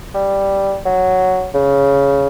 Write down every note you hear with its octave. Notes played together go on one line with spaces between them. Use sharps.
G3
F#3
C#3